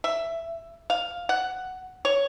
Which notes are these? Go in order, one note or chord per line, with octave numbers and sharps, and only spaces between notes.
E5
F5
F#5
C#5